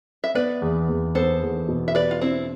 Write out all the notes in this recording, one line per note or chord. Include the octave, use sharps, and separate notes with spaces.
E5
B3 B4 D5
E2
E2
B3 A4 C5
E2
B2
E5
G4 B4 D5
F4
C4 D4 E4